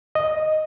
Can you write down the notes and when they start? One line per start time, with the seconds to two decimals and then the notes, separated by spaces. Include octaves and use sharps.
0.15 D#5